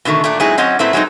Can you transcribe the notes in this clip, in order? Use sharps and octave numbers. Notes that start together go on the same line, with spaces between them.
B2 D3 D#3 A3
A#2 A3 D4
F#3 G#3 C4 D#4 E4 G#4
F#3 C4 C#4 D#5 F#5
A#2 A3 C4 E4 B4
F#3 G#3 C4 C#4 D#4